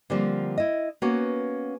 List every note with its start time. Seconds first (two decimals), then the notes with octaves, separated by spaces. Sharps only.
0.10 D3 F3 G3 A#3 C4
0.58 E4 D#5
1.02 A#3 B3 C#4 F#4